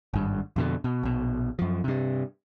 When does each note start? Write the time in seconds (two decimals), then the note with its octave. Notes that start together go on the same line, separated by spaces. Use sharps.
0.14 G#1 G2
0.56 F2 B2 D3
0.84 B2
1.03 A#1 B2
1.59 F#2 F3
1.84 G2 C3